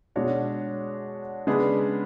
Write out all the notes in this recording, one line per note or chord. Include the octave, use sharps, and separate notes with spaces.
B2 G#3 D4 F#4 C#5
C#3 G#3 B3 D4 G#4